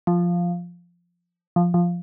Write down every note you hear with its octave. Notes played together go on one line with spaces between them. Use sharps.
F3
F3
F3